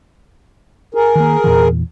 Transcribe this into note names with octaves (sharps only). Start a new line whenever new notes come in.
G#4 A#4
D#3 A#3
E2 A#2 E3